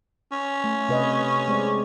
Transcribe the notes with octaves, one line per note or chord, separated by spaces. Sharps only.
C#4
A3
C3 B4 D#5
G#3 C4 D5